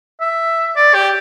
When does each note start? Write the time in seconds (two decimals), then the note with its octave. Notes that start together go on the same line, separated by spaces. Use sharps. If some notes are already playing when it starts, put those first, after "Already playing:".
0.21 E5
0.76 D5
0.94 G4